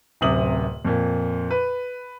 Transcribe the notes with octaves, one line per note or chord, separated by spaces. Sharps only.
D1 F#2 C3 D#6 F#7
F2 A#2
B4